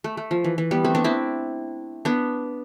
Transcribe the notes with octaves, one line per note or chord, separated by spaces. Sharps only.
A3
A3
F3
E3
E3
G3 B3
A3 C4
B3 D4
C4 E4
B3 D4